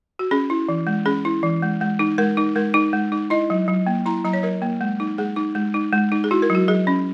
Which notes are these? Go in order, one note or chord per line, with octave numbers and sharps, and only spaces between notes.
F#4
C#4 G#4
E4
E3
G#3
C#4 G#4
E4
E3
G#3
G#3
D#4
G#3 A#4
D#4
G#3 A#4
D#4
G#3
D#4
E4 D#5
F#3
F#3
A#3
E4 A#5
F#3 A#5
C#5
F#3 A#4
A#3
G#3
D#4
G#3 G#4
D#4
G#3
D#4
G#3
D#4
G#4
E4 F#4
A#4
F#3
F#4
F#3 G#4
C#4